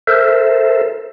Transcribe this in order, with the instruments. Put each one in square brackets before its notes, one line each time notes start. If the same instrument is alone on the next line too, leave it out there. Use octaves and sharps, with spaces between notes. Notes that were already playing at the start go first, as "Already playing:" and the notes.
[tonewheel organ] A4 A#4 C5 E5